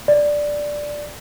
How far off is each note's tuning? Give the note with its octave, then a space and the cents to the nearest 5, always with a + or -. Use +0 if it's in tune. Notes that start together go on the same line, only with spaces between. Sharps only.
D5 +0